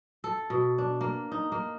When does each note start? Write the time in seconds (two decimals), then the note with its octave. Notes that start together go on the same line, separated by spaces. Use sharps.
0.24 A4
0.50 B2
0.78 D4
1.01 A#3
1.32 D#4
1.52 A#3